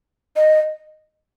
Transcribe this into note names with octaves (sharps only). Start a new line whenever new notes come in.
D#5